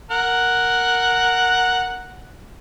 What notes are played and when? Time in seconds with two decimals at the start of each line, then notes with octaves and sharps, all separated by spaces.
0.11 A#4 F#5